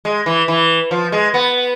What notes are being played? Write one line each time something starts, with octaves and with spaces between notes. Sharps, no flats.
G#3
E3
E3
F3
G#3
B3